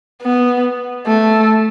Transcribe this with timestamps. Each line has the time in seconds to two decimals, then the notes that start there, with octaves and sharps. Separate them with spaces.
0.22 B3
1.07 A3